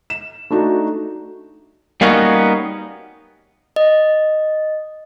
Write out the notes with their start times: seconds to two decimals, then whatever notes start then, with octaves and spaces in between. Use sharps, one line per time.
0.10 E7
0.50 A3 D4 D#4 F#4
2.01 G3 A#3 B3 C#4 D#4 F#4
3.76 D#5